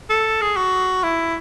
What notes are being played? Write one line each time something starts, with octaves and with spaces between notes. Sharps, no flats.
A4
G#4
F#4
E4